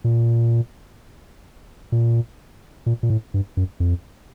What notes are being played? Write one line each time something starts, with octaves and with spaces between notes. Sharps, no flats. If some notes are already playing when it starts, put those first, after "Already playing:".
A#2
A#2
A#2
A#2
A2
G2
F#2
F2